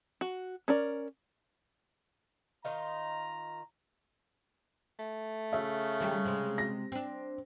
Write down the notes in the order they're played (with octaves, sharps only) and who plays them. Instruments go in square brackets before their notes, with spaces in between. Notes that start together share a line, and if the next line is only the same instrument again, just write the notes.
[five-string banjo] F#4
C#4 A#4 D5
[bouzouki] D#3 D#4 F4 [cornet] A#5
[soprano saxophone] A3
[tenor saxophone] C#3 [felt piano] E5
[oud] D#3 G3 G4
C3 G#3
[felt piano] A#6
[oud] C4 D4